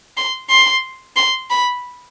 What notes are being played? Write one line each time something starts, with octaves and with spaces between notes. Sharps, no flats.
C6
C6
C6
B5